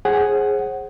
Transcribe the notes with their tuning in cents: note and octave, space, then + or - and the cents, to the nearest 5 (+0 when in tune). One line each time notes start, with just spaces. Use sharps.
G#4 +0 C5 +40 F#5 +15